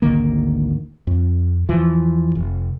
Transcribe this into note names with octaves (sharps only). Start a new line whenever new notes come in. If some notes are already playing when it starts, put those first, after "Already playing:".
G#1 D2 D#3 A#3
F2
E2 E3 F3
F1